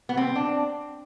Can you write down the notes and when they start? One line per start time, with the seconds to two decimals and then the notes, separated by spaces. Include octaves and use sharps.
0.09 B3
0.17 C4
0.35 D4